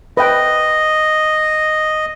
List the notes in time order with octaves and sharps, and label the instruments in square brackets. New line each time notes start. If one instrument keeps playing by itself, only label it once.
[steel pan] B4 E5 G5 [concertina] D#5